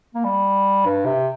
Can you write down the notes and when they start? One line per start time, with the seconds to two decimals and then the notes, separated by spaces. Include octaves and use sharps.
0.15 A#3
0.24 G3
0.85 G2
1.06 C3